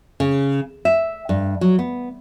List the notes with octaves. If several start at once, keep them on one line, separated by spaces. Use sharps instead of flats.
C#3
E5
G2
F#3
B3